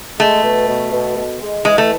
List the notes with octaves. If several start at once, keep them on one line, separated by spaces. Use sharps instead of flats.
G#3 A3
B2
B2
B2
B2
G#3
E3 G#3
A3